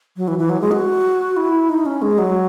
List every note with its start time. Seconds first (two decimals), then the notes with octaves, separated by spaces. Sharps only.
0.17 F#3
0.28 E3
0.39 E3
0.50 F#3
0.61 G#3
0.71 F#4
1.37 E4
1.69 D#4
1.86 C#4
2.02 G#3
2.18 F#3